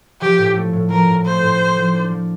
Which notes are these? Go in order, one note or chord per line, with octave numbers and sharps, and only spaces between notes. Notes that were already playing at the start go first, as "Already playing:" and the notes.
F3 G4
A2
A3
A2
F3 A#4
A2
A3 C5
A2
A#3
F3
D4
F3